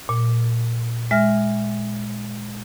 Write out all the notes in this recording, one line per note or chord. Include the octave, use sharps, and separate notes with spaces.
A#2
G#3 E5 F6 A#6